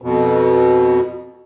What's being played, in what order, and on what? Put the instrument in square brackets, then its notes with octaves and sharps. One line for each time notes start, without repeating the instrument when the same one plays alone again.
[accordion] F2 B2